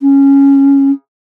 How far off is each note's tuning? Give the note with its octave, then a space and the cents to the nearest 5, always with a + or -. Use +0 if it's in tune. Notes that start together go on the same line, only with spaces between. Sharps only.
C#4 -5